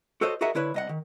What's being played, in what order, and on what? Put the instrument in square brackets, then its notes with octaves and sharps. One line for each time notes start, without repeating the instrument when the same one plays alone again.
[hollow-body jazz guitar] F#4 A4 C5 C#5 D#5
F#4 G#4 A#4 D#5 E5 F#5
D3 E4 B4 C#5
C2 D#5 F#5
D#3